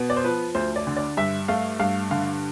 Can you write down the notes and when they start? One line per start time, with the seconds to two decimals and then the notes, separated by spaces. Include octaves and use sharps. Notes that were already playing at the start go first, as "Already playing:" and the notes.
Already playing: B2 B3
0.10 D5
0.16 C5
0.24 F3 B4
0.55 D2 C5
0.76 D5
0.87 D3
0.97 D5
1.17 G2 E5
1.48 A3 F5
1.80 G2 F5
2.11 D3 F5